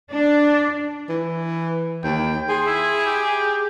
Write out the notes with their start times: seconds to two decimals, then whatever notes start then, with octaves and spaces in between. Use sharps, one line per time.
0.11 D4
1.09 E3
2.04 D#2 G5
2.49 G#4 C6
2.66 E4
3.06 G4